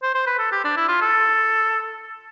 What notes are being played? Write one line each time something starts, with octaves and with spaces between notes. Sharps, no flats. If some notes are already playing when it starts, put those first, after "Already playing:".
C5
C5
B4
A4
G4
D4
E4
F4
A4